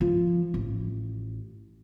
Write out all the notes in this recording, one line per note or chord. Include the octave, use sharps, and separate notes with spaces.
F3
A1